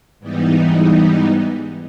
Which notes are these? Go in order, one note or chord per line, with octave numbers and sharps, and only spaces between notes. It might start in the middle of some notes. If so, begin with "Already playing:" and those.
G#2 E3 G3 B3 D#4